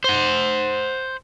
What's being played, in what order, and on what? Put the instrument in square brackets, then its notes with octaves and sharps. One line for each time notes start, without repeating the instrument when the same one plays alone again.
[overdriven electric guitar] C5 F#5